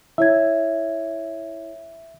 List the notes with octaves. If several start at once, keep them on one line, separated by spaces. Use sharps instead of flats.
E4 C#5 E5 G#6